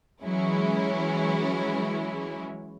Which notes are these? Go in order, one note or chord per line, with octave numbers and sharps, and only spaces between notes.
E3 F#3 G#3 C#4 E4